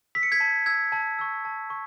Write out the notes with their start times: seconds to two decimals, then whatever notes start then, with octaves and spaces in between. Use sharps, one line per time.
0.15 E6 B6
0.23 C#7
0.32 G#6 B6
0.40 A5
0.66 E6 G#6
0.92 A5
1.19 C#6 E6
1.45 A5
1.70 C#6